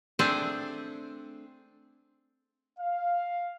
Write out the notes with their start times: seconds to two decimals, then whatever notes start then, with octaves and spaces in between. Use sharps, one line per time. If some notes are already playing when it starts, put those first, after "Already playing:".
0.19 A3 C4 D4 G#4 A4 G5
2.79 F5